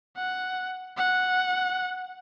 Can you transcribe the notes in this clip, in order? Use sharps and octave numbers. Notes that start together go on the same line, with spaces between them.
F#5
F#5